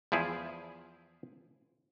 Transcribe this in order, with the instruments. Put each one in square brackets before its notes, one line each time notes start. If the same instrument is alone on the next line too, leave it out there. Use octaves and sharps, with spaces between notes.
[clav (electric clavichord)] E2 F3 E4 G#4